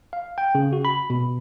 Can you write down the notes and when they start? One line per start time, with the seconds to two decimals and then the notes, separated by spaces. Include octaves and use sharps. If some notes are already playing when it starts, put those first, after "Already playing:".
0.13 F5
0.38 G5
0.55 C#3
0.73 F#4
0.85 B5
1.10 B2